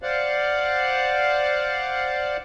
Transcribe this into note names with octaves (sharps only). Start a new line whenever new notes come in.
C5 D5 F5 F#5